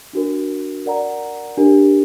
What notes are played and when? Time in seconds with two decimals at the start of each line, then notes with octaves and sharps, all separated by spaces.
0.13 D4 F#4 A#4
0.86 A#4 D5 F#5 A#5
1.57 D4 G4 A#4